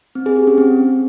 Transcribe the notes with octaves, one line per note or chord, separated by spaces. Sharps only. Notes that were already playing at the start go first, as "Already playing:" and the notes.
C4
G#4
G4
C#4
C4